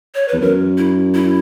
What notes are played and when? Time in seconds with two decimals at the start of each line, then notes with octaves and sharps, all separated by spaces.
0.15 C#5
0.28 E2 B4
0.41 F#2 A#4
0.78 E4
1.14 E4